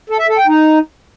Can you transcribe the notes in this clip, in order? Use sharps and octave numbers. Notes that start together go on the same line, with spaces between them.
A4
E5
A4
G5
D#4